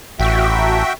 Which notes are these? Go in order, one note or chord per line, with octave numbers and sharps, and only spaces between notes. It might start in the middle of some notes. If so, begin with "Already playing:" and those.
A1 F#4 E5 G5